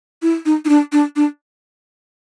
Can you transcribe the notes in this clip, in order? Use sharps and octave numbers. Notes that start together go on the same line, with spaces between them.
E4
D#4
D#4
D4
D4
D4